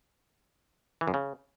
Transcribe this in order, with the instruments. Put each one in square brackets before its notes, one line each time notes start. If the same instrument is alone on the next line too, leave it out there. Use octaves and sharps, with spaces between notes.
[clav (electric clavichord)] E3
F#2
C#3